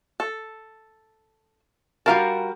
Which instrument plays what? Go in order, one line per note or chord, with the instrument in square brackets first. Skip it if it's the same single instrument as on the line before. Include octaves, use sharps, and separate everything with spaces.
[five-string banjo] A4
[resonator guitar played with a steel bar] G3 F#4 A#4 [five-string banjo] F4 F5 A5